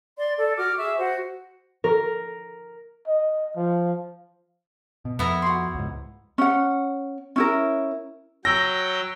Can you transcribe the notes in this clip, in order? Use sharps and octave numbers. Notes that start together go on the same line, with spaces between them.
D5 C6
A4 D5
F#4 D6 F6
G#4 E5 C#6
F#4 C5 F#5
A#4
D#5
F3
B2
F2 B3 E4 A#5
F#4 C6
C#2 G#2
C#4 F#5
C#4 E4 A#4
F#3 G5 E6 A#6